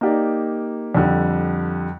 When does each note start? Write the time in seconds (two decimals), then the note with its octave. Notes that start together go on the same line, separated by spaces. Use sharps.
0.01 A#3 D#4 G4 A#4 D5
0.95 F2 D3 G3